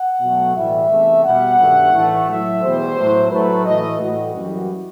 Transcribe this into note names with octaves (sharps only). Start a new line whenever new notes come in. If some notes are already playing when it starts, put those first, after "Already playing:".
Already playing: F#5
B2 F#3 A3
A2 E3 G3 E5
E2 C3 E3 A3
B2 G3 F#5
G2 D#3 A3
A2 E3 A3
A2 F#3 A3 E5
E2 B2 G3 C5
A2 F#3 A3
A2 F#3 A3 B4
A2 E3 A3 D#5
A2 E3 G3 F#4
F#2 E3 G3